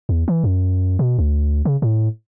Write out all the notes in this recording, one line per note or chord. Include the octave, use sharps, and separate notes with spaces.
E2
E3
F#2
B2
D2
C#3
A2